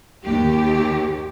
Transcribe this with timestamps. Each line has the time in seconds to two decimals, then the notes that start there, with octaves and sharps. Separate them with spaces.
0.24 D#2 G4